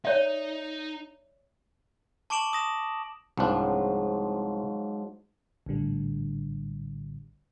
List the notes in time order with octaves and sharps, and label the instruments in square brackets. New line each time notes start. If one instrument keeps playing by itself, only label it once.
[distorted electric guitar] D#4 [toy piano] C#5 D5 E5
[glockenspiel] A5 C#6 D6 D7 E7 F#7
D#6 A#6 E7
[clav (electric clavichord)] C2 D4 [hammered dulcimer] G#2 F3 F#3
[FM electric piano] A#1 A2 D3 G3